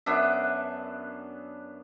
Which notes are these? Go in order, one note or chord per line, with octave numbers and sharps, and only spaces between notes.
F#2 B3 D4 E5